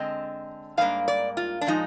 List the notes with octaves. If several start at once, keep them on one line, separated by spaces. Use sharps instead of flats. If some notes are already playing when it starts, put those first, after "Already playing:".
Already playing: D3 G#3 C4 D#5
G#2 G3 A#3 D4 F5
D5
F4
D4
A#2 F3 G#3 D#4